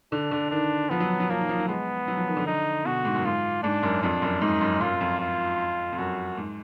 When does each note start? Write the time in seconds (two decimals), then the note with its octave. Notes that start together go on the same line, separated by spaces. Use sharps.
0.12 D3 D4
0.31 D3
0.51 D#3 D4
0.90 F3 B3
1.00 F#3
1.20 F#3
1.30 F3 A#3
1.39 D#3
1.49 F3
1.59 F#3
1.68 G#3 B3
2.08 F#3
2.17 F3
2.28 D#3
2.37 D3
2.47 D#4
2.85 B2 F#4
3.05 G#2
3.15 F#2
3.25 G#2 F4
3.63 G#2 D4
3.83 F#2
4.03 F2 D4
4.22 F#2
4.41 G#2 D#4
4.61 F#2
4.81 F#2 F4
4.93 F#2
5.01 F2
5.21 F4
5.92 F2
5.98 F#2 F#4
6.37 G#2